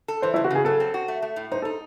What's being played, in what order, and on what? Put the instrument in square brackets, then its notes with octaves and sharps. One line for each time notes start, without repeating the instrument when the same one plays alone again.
[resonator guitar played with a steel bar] A4
[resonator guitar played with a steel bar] E3 [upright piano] C5
[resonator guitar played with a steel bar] C#3 [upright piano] E4
[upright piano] F#4
[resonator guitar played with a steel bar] C#3 [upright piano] G#4
[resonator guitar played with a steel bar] F#3 [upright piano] A4
[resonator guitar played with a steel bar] C4
F#4
A3
A3
A2
[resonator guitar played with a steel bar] D#4 [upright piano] C5
[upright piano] A4
[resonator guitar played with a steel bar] D#4